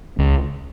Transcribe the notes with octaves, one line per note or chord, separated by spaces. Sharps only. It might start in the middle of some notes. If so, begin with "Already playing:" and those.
C#2